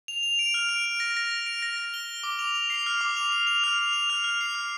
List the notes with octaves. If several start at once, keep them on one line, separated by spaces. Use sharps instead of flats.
F7
F7
D7
F6
D7
D7
A#6
A#6
A#6
D7
A#6
A#6
G7
G7
D6
F7
F7
C7
F6
D6
F7
F7
F7
F6
F7
F7
F6
F6
C7
F6